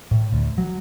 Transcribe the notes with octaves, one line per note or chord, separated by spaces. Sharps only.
A2
D2
F#3